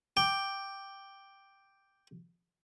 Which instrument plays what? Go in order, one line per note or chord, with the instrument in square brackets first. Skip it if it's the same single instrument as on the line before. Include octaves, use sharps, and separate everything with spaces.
[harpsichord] G5 [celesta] D6